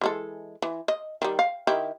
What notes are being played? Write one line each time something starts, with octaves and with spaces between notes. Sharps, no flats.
E3 G#3 A4
E3
D#5
D#3 G3
F5
D#3 E4 G4